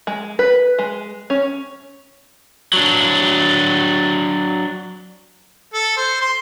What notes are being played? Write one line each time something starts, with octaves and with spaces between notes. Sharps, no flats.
G#3
B4
G#3
C#4
F#3 D4
A4
C5
C6